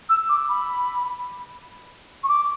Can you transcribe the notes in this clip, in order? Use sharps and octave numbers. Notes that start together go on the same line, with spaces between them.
E6
D6
B5
C#6
D6